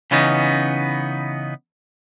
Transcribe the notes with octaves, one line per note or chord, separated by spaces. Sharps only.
C#3 E3 B3 C#4 D#4